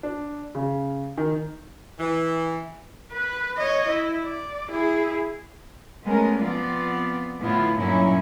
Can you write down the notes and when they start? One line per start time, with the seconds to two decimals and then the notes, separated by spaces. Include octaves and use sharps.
0.03 D4
0.55 C#3
1.18 D#3
1.99 E3
3.12 B4
3.57 C#5 D#5
3.89 E4
4.24 D5
4.71 E4 G#4
6.06 G#3 A3 B3 C#4 A#4
6.41 F3 B3 C4 F4 D5
7.40 A2 D3 B3 E4 F4
7.77 G2 A#2 F#3 C#4 D#4 E4